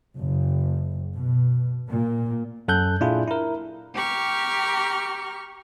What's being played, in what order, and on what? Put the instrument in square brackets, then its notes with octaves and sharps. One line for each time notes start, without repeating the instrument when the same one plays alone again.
[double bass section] F#1
B2
A#2
[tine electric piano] F#2 A4 F#6 G6
A#2 D4 E4 F4 G#4
E4 A#4
[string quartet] G4 A#5 C#6 F6